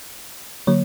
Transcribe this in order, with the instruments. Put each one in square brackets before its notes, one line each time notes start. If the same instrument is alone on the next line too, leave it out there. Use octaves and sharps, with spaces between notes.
[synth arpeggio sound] D3 F#3 A#3 C#5